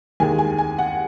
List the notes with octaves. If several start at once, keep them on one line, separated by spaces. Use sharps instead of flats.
D#2 D#3 G#3 G#5
G#5
G#5
F#5